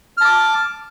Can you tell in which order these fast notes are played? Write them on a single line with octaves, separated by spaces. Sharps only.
F6 A5 D6